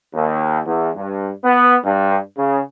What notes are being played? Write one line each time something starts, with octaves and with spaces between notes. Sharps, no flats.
D#2
E2
G2
B3
G2
C#3